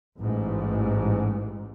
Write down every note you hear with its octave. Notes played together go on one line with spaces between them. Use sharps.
A1 G#2